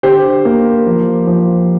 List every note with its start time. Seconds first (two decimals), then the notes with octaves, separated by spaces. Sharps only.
0.03 D3 G4 C5
0.45 A#3
0.87 F3
1.27 F3